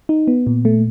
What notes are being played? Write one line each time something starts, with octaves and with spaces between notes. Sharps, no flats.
D#4
B3
A#2
A3